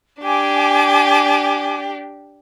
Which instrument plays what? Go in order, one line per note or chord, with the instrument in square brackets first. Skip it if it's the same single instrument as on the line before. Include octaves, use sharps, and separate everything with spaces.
[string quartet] D4 G4 [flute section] G#5 D6